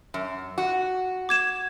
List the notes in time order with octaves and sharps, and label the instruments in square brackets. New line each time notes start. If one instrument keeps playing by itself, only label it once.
[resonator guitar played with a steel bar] F#2
F#4
[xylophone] D6 G#6 E7